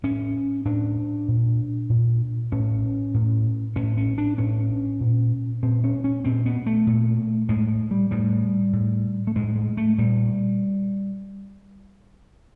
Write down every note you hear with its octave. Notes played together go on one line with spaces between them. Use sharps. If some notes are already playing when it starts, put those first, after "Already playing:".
A2 C#4
A2 D4
A#2
A#2
A2 C#4
A2
A2 C#4
C#4
D4
A2 C#4
A#2
A#2 C4
C#4
C#4
A#2 C4
B3
A3
A#2
A2 G#3
G3
A2 G3
A2
A3
A2 G#3
G#3
A3
A#2 G3